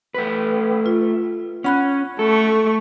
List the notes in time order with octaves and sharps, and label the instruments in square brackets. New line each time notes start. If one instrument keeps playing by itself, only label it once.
[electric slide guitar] A3 B4
[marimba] F4
[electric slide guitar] C#4 [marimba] F#5 B5 F#6
[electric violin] A3 C#6 [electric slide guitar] A4